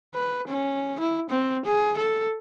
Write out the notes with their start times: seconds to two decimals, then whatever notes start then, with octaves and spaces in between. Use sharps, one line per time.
0.14 B4
0.47 C#4
1.00 E4
1.30 C4
1.65 G#4
1.97 A4